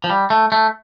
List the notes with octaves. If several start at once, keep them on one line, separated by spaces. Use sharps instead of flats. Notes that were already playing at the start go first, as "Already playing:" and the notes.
F3
G3
A3
A3